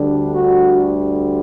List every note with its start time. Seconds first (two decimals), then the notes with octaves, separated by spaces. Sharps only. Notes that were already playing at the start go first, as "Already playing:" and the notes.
Already playing: D2 D3 G3 D4
0.34 F#4